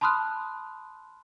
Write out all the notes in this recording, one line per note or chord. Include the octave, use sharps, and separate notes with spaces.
A5 B5 C6 D#6 F6 F#6